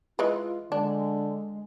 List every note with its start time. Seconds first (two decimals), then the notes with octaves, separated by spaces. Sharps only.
0.19 E3 G#3 F4 B4
0.72 D3 G#3 D4